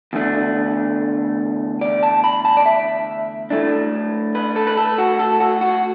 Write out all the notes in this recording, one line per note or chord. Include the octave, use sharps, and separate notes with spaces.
E2 D3 A3 D4
D5
A5
B5
A5
D5
E5
A2 A3 D4
B4
A4
B4
A4
F#4
A4
F#4
F#4